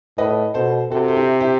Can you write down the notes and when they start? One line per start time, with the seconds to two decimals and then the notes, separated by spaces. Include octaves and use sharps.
0.18 A2 B4 D#5
0.54 B2 A4 C5
0.91 C3 F#4 A4
1.08 A4
1.16 E4 G4
1.40 E4 G4